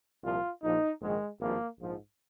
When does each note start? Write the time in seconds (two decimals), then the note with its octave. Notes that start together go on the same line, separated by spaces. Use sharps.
0.24 C2 A#2 F3 F4
0.63 A#1 A#2 F3 D#4
1.01 A#1 G#2 D#3 G#3
1.40 G#1 G2 F3 A#3
1.80 A#1 G#2 F3